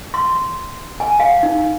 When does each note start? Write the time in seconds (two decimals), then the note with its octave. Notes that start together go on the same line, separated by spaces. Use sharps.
0.14 C6
1.00 G#5
1.20 F5
1.43 D#4